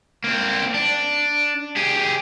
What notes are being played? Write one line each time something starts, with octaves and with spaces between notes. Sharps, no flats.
A#3 C4
D4
G4 G#4